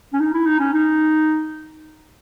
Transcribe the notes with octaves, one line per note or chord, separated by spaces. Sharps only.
C#4
D#4
E4
D#4
C#4
D#4